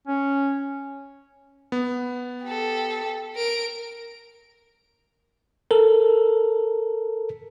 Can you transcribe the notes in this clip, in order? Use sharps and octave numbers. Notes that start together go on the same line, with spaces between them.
C#4
B3
G4 A4
A#4 D7
A4 A#4